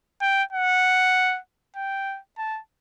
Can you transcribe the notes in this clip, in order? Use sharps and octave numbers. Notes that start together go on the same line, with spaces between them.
G5
F#5
G5
A5